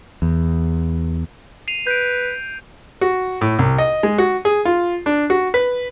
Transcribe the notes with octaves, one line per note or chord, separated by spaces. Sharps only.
E2
C7 D#7 F7
B4 G6 D7
F#4
A2
C2
D#5
G#3
F#4
G#4
F4
D4
F#4
B4